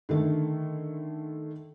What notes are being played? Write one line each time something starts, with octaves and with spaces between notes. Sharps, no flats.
D3 D#3 A3